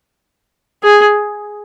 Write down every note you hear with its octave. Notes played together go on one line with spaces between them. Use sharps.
G#4